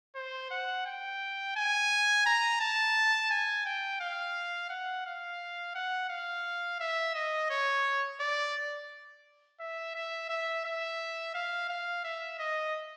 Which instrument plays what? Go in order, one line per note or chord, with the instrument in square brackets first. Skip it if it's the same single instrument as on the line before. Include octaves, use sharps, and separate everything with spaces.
[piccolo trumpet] C5
F#5
G5
G#5
A#5
A5
G#5
G5
F5
F#5
F5
F#5
F5
E5
D#5
C#5
D5
E5
E5
E5
E5
F5
F5
E5
D#5